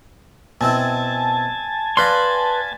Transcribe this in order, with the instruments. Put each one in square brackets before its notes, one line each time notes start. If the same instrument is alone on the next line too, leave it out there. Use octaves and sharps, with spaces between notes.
[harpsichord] B2 C4 E4 [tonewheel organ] G#5 A5
[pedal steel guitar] B4 C6 [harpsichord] D5 F5 A#5